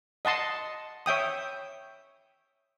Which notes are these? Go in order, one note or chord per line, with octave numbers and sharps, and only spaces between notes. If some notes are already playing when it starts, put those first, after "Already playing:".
D#5 F#5 A5 C6
C#5 E5 G5 D#6